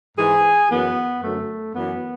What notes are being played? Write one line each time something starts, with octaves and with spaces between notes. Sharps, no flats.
G#2 E3 G#4
F#2 E3 B3
F#2 D3 F#3 A3
F#2 E3 B3